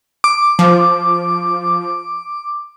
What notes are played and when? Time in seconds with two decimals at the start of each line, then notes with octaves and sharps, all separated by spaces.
0.24 D6
0.59 F3